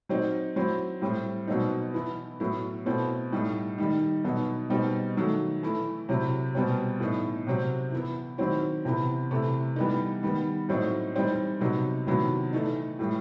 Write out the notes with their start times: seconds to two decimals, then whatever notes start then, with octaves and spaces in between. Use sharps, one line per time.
0.09 F#3 C4 D#4
0.56 F#3 C4 E4
1.02 A2 G3 C4
1.48 B2 F#3 C4 D#4
1.94 E3 B3 E4
2.40 A2 F#3 B3 E4
2.86 B2 A3 C4 E4
3.32 A2 G3 D#4
3.78 D#3 G3 D#4
4.24 B2 F#3 B3 D#4
4.70 B2 G3 C4 D#4
5.17 D#3 F#3 A3
5.63 E3 A3 E4
6.09 C3 F#3 C4 E4
6.55 B2 G3 C4
7.00 A2 E3 B3 D#4
7.47 C3 F#3 C4
7.92 E3 B3 E4
8.38 D#3 F#3 C4 E4
8.85 C3 E3 B3 E4
9.31 C3 E3 A3 E4
9.76 E3 G3 B3 D#4
10.23 D#3 G3 B3
10.69 A2 F#3 C4 D#4
11.15 E3 G3 C4 D#4
11.60 C3 F#3 B3 D#4
12.07 C3 D#3 F#3 B3 E4
12.53 E3 A3 D#4
12.99 A2 E3 G3